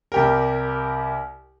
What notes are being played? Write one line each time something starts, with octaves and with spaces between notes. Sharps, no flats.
C2 G4 A#4